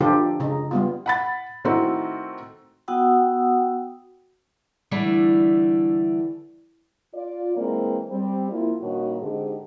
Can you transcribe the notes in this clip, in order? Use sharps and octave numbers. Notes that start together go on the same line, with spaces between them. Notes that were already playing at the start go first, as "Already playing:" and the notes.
D3 F3 D#4 F4 G4 A4
C#3 D#4
G3 B3 F4
F#5 B5 A6
D#3 A3 C4 D#4 E4 F#4
B3 F#4 F#5 G5 D#6 E6
D3 E3 G3 A3 D4
F4 D5
E3 G#3 A#3 C4
G3 C4
F3 A#3 E4 F4
G2 A#2 D#3 C#4 D#4 F#4
G#2 D3 G#3 C4 D#4 G4